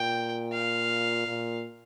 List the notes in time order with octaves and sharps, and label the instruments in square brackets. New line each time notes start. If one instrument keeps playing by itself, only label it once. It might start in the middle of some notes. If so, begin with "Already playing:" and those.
Already playing: [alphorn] A#2 [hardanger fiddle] G5
[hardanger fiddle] F5
[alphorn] A#2